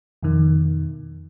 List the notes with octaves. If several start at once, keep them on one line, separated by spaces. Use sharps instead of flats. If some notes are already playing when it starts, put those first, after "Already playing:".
F2 B2 D#3